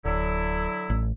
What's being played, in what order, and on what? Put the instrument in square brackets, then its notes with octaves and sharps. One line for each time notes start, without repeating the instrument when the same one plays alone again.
[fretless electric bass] D1 [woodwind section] D3 F#3 E4
[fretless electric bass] A1